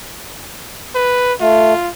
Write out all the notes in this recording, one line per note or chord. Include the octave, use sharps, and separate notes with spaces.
B4
A3 F4